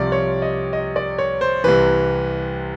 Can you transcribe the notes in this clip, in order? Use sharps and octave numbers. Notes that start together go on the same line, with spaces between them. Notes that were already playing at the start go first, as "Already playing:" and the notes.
Already playing: C2 C3 F3 D5
C#5
D#5
D#5
D5
C#5
C5
C2 C3 E3 B4